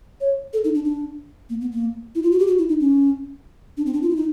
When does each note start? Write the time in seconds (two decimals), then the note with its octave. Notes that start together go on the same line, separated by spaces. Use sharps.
0.21 C#5
0.53 A4
0.64 D#4
0.75 D4
0.85 D4
1.50 A#3
1.61 B3
1.72 A#3
2.15 E4
2.23 F4
2.32 F#4
2.39 G4
2.47 F#4
2.58 E4
2.69 D#4
2.80 C#4
3.77 D4
3.86 C4
3.94 D4
4.02 F4
4.10 E4
4.16 D#4